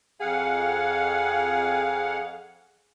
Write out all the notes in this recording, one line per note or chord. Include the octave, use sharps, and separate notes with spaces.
F2 G#4 F5 F#5